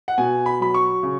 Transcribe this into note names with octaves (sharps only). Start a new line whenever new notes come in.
F#5
B2 G#5
B5
F#3 B5
C#6
C#3